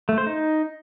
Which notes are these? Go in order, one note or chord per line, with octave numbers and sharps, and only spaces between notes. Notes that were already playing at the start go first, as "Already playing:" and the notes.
A3
C5
D#4